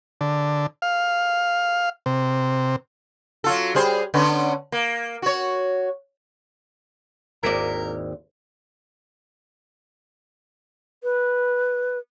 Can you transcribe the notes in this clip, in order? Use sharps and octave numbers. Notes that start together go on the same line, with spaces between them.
D3
F5
C3
F#3 F4 A4
G3 G#4 C5
D3 B3 C#4
A#3
F#4 C#5
G#1 D#2 C4 D#4 E4 A#4 D5
B4